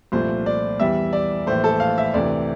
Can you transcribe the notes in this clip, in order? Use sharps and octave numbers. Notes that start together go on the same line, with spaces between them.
C2 A#2 F3 A3 C5
D5
E2 E3 G3 E5
D5
A#1 A2 E3 A3 C5
A4
F5
E5
D2 C3 E3 D5